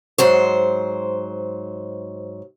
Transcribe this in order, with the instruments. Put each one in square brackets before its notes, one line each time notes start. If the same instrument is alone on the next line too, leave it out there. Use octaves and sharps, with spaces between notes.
[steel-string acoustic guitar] G#2 F#3 C5